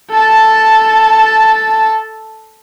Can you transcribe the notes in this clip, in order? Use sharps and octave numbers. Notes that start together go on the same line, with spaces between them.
A4 A5